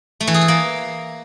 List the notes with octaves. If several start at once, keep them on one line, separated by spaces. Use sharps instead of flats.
A3
E3
G#4
A4
A#3